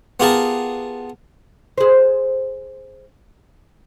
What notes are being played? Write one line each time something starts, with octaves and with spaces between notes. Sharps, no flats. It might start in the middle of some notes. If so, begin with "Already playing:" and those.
B3 F4 G4 G#4 A#4 A5
G#4 C5